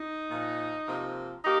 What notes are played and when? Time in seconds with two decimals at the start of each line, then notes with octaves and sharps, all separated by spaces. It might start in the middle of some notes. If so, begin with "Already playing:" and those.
Already playing: D#4
0.30 A#2 F3 A#3
0.87 C3 F3 A#3
1.43 A#3 D#4 G4